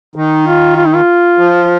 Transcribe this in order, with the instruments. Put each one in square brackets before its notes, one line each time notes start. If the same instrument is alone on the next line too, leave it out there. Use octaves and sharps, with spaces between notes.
[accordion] D#3 [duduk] D#4
[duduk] F4
F4
D#4
F4
[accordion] F3